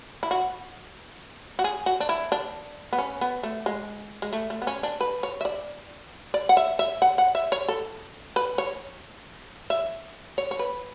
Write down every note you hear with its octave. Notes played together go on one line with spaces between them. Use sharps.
E4
F#4
F#4
G#4
F#4
D4
E4
D4
B3
C#4
B3
A3
G#3
G#3
A3
A3
B3
C#4
D4
B4
C#5
E5
D5
D5
F#5
E5
E5
F#5
F#5
E5
C#5
A4
B4
C#5
E5
C#5
C#5
B4